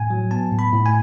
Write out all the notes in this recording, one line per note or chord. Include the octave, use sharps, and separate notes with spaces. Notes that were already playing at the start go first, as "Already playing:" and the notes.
Already playing: A2 G#5
F#3
B3 A5
A2
B5
A2
G#5